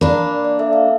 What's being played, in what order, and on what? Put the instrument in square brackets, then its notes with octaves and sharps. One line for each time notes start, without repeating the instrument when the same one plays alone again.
[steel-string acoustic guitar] A#3 D4 [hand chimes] A#4 B5
[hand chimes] D5
A4 E5
F5